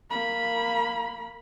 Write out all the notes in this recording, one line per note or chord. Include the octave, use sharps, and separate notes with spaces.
A#3 B5